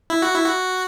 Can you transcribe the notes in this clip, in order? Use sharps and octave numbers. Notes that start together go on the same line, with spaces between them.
E4
F#4
E4
F#4